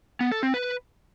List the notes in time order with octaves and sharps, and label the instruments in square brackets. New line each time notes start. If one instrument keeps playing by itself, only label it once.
[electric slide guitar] B3
A4
C4
B4